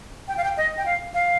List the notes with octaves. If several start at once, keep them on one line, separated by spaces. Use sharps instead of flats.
G5
F5
G5
D#5
G5
F5
F5